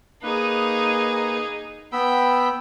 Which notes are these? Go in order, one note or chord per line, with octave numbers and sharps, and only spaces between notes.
A#3 D#4 G#4 B4
B3 G5 B5 E6